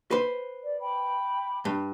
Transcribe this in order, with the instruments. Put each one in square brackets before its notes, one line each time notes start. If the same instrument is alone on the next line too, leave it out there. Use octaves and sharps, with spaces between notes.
[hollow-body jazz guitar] B4 C5
[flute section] D5
G5 B5 D6
[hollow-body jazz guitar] G2